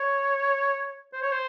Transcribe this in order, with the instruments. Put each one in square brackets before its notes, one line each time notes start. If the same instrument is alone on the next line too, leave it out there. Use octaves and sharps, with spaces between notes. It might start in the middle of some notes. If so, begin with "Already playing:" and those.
Already playing: [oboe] C#5
C5
C#5
C5